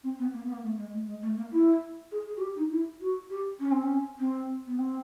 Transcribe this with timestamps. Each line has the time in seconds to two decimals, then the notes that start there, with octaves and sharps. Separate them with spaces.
0.03 C4
0.19 B3
0.33 A#3
0.42 B3
0.52 A#3
0.63 A3
0.77 G#3
0.93 A3
1.07 G#3
1.22 A3
1.37 A#3
1.51 E4
2.11 G#4
2.26 G#4
2.36 F#4
2.40 G4
2.56 D#4
2.71 E4
3.00 F#4
3.30 G4
3.60 C#4
3.71 C4
3.82 C#4
4.19 C4
4.67 B3
4.78 C4